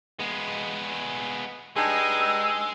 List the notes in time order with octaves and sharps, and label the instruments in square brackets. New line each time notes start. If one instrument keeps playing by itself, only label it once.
[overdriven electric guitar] G#3 B3
[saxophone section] G2 D#4 G#4 [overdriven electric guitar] G#3 [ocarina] E6